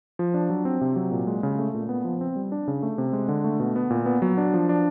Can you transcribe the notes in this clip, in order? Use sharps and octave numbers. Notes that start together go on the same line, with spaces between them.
F3
D4
F#3
C4
C3
F#3
A#2
G#3
C#3
A3
A#2
B3
F3
C4
G3
D4
C#3
A3
C3
G#3
D3
A3
B2
B3
A#2
B3
F#3
D4
F3
D4